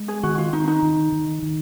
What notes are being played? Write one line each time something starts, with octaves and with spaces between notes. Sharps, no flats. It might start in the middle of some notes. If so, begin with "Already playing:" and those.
Already playing: G#3
G#4
D#3 F#4
F4
D#3 D#4
D#4
D#3
D#3
D#3